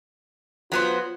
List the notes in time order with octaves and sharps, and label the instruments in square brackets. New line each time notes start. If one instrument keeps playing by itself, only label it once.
[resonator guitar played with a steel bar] F#3 B3 C5 [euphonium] F4